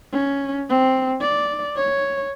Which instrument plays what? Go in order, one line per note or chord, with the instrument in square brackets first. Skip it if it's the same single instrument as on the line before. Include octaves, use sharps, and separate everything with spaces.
[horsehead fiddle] C#4
C4
D5
C#5